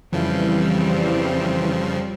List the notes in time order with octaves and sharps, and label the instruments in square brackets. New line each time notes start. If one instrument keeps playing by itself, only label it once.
[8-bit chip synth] F2 C#3 F3 [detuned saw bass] E3 [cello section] G3 C4